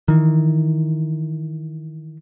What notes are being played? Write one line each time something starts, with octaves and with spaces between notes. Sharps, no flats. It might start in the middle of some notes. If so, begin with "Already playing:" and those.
D#3 E3